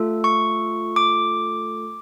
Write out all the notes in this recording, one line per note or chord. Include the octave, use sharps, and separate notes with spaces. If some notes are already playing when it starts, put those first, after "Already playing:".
Already playing: A3 F4 A4
C#6
D6